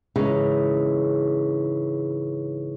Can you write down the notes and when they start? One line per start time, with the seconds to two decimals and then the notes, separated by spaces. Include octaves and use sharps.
0.16 G#2 C#3 E3